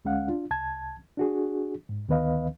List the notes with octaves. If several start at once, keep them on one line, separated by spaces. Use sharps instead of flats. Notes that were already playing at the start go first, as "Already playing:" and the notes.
D2 G#3 C#4 F5 F#5
D4 F4
C2 A5 G#6
D4 F#4 G#4
G#2
D2 D#3 B3 B4 D#5 F5